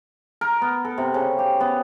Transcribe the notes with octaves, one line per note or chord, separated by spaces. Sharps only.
A#4
B3
A4
C3
C#3
G4
B3